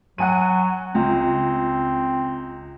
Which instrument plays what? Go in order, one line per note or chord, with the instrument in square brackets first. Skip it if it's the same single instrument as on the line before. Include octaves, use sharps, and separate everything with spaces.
[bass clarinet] F#3 [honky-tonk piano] F#5 G#5 D#7
[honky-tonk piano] C#2 [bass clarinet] C4